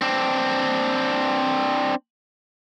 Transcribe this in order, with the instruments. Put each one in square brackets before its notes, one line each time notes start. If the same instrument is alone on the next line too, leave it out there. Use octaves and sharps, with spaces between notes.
[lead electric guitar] C4 D4